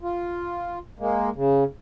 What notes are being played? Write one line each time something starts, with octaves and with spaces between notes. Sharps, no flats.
F4
G#3 A#3
C#3